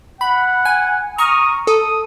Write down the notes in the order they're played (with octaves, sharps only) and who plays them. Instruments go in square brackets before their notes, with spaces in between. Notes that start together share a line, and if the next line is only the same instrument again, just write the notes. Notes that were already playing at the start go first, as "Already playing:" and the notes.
[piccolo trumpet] F#5 [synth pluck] B5
[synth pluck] G#5
[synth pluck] A#5 C#6 F6 [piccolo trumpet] D#6
[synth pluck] A4 [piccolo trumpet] D#6